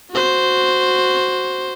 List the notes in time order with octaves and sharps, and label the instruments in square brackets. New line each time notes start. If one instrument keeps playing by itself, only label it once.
[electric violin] F#4 C5